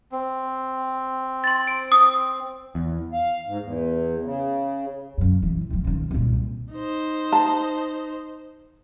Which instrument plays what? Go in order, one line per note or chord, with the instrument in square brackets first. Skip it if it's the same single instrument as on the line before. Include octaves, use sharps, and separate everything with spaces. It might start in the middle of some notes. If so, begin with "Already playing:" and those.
[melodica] C4
[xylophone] C6 A6
D7
D#6
[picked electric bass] E2
[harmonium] F5
G#2
E2
C#3
[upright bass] F#2 C#3
E3
C3 F3
C#2 D#3
C2 A#2
[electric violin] D#4 C5
[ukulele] A5